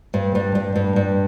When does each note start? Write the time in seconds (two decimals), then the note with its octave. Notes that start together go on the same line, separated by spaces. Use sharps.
0.14 G2
0.35 G2
0.55 G2
0.76 G2
0.96 G2